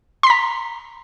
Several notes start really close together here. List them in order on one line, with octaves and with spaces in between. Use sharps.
C6 B6 A#5